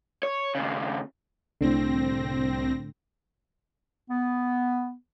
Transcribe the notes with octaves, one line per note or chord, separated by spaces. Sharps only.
C#5
D#2 C#3
C2 A2 D3 C4 A#6
B3